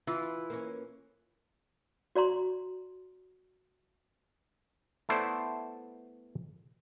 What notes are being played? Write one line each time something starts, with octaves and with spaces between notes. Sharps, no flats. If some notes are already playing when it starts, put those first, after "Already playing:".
E3 F4
A#3 C#4
F#4 D5 A#5 C6
A3 B3 E4 A4 C5 D5